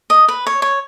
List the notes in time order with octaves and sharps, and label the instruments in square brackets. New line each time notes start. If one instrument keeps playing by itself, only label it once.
[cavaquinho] D#5
B4
C#5
C#5